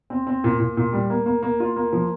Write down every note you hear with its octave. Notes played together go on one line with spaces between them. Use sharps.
C4
C4
A#2
A#2
A#2
G3
A#3
A#3
A#3
F4
A#3
F3